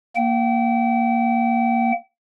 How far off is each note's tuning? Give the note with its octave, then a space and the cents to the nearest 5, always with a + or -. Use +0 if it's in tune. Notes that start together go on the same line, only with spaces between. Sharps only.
A#3 +0 G5 -35